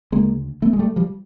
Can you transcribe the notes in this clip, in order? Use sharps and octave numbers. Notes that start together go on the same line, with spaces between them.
D2 C#3 G#3 A#3
A3 B3
G#3
G3 A3
F3 G3